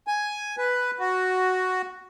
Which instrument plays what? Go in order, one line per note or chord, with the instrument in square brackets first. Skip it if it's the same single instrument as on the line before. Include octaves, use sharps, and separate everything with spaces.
[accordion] G#5
B4
F#4